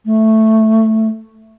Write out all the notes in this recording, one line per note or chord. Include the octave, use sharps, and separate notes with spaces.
A3